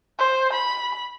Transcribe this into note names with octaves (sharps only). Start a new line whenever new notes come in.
C5
B5